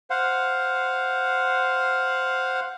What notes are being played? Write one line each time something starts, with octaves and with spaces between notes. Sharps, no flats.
C5 F5 F#5